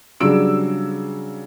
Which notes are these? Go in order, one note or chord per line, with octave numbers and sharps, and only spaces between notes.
C#3 F#3 G3 D4 E6 D7